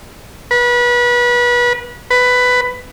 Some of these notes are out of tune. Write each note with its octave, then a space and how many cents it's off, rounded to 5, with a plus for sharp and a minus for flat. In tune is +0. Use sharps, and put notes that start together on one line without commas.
B4 -30
B4 +10